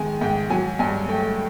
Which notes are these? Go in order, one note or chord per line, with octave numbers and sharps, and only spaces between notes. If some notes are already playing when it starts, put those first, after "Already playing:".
Already playing: D#3 G#3 G#5
G#2 G5
F#3 G#5
G2 G#5
A3 G5